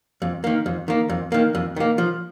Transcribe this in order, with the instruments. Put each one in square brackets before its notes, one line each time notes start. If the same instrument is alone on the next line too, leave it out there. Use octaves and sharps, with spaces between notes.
[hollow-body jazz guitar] F2
D#3 A#3
F2
D#3 A#3
F2
D#3 A#3
F2
D#3 A#3
F3